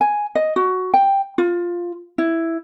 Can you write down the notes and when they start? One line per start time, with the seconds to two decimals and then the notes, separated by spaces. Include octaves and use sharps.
0.01 G#5
0.35 D#5
0.56 F#4
0.94 G5
1.38 F4
2.18 E4